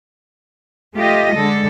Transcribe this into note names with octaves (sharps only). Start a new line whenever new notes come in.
A3 F4 G4 D#5
D3 G#3 A4